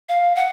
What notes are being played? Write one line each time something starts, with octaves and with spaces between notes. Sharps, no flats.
F5
F#5